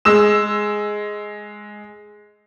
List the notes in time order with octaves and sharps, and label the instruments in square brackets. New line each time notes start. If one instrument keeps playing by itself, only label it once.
[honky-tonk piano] G#3 E6 E7